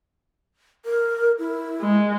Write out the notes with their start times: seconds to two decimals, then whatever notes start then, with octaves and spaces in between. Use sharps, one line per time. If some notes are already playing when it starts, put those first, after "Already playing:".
0.85 A#4
1.39 E4
1.81 G#3